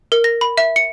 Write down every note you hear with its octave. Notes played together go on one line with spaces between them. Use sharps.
A#4
A#6
B5
E5
C#7